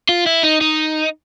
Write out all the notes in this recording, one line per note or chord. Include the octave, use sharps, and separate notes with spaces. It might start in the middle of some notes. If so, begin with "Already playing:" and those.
F4
E4
D#4
D#4